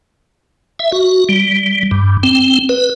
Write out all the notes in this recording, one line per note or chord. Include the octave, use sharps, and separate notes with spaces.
E5
F#4
G3
G2
C4
B4